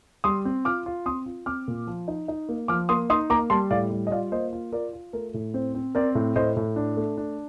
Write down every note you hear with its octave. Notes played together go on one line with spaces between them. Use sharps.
G3 C6 D#6
C4
F4 D6 F6
F4
C4 C6 D#6
F4
C4 D6 F6
A#2
F3
D#4
D#4
A#3
F3 D6 F6
A#3 C6 D#6
D#4 C6 D#6
A#3 A#5 D6
G3 A5 C6
A2 D5 F5
G3
D#5
F4 D5 F5
A#3 C5 D#5
F4
F4 A#4 D5
F4
A3 A#4
A2
C4 C5
C4
C4 A#4 D5
A2
A2 C5 D#5
A2
D4
A3
D4